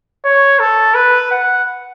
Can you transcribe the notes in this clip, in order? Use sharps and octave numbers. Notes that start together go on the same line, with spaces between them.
C#5
A4
B4
F#5